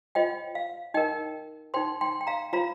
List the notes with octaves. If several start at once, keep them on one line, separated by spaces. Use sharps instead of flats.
F4 C5 D#5 G5
F5
D#4 A#4 D#5 G5
D#4 C5 G5 C6
G5 C6
G5
F5 A#5
F4 C5 F5 A#5